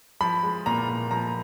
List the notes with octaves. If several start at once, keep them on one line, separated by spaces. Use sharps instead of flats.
F3 B5
G#3
A#2 A#5
A#2
F3 A#5